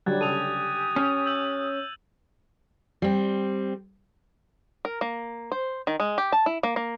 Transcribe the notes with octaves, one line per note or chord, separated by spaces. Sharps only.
D3 F#3 G3 F#6 G#6 A6
C#3 G4 A4 G#5 D#6 D#7 F7
C#4
E6 G6 F#7
G3 C4
A#4
A#3
C5
D#3
G#3
G4
A5
E4
A#3
A#3